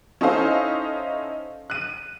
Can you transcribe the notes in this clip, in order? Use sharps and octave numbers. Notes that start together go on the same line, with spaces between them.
C#4 D#4 E4 A4 C5 F5
F#6 D#7